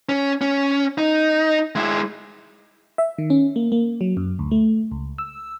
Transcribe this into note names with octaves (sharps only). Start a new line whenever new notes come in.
C#4
C#4
D#4
G#3 E4
E5
D#3
C#4
A#3
A#3
F#3
F#2
D2
A3
C#2
E6